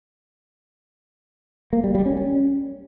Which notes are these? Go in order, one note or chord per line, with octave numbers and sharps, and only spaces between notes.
A#3
G3
G3
C#4
C#4